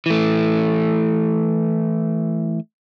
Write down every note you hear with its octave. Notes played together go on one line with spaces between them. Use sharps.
E3 A3